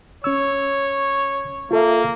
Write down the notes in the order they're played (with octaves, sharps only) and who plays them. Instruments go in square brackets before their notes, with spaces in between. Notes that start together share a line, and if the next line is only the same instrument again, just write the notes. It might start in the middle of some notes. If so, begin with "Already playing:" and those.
[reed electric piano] C#4 E6 [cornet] C#5
[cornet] A#3 [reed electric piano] F4 A4 E5